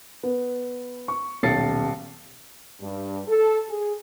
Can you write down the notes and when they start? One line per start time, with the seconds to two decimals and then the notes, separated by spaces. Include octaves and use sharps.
0.23 B3
1.08 C#6
1.43 D#1 B1 A6 C7 C#7
2.81 G2
3.27 A4
3.69 G#4